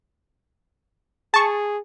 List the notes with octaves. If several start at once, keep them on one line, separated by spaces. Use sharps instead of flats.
G#4 A5 C#6